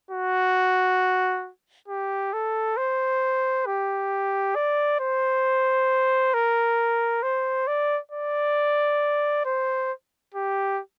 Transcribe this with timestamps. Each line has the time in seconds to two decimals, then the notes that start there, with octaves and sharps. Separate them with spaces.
0.11 F#4
1.88 G4
2.33 A4
2.77 C5
3.66 G4
4.55 D5
5.00 C5
6.34 A#4
7.23 C5
7.67 D5
8.11 D5
9.45 C5
10.34 G4